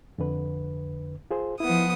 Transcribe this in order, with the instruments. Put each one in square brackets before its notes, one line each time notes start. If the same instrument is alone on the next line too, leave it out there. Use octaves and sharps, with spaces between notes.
[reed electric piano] F2 D3 B4
F4 G#4 C5
[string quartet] F3 B3 D#6 [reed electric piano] E4